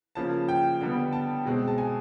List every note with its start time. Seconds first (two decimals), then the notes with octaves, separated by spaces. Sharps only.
0.15 C#3 F3 A#3 A5
0.48 G5
0.81 D3 G3 B3
1.13 A5
1.45 B2 G#3 C4
1.68 A5
1.78 G#5